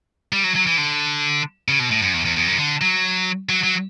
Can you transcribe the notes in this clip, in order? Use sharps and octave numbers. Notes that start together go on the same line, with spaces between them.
G3
F#3
F#3
E3
D3
C#3
B2
A2
F#2
E2
E2
E2
F#2
D3
F#3
F#3
F#3